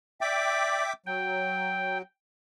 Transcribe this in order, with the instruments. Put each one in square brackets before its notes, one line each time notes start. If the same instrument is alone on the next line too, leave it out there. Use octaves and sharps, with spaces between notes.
[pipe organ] D5 [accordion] E5 G5 D6
[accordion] F#3 [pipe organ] G5